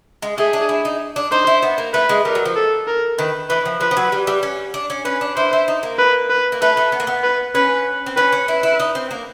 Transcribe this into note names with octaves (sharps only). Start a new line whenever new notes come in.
G#3
A3 G#4
D4
E4
D#4
D4
D#4 C5
E4
B3
A#3
A3 B4
G#3
G3 A#4
F#3
F3
A4
A#4
D#3 B4
E3 B4
F3
F3 B4
F3
F#3
G3
G3
C#4
D4
C#4
C#4 B4
D4
E4 C5
E4
D#4
A#3
B4
B4
A#3
A3 B4
A3
B3
A#3
B3
B4
C#4 B4
C4
C#4 B4
C#4
E4 B4
E4
D#4
C4
A#3